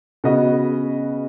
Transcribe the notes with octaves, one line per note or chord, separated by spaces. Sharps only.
C#3 B3 F#4 B4 D#5